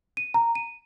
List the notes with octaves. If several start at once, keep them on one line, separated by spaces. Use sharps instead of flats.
D#7
A#5
D#7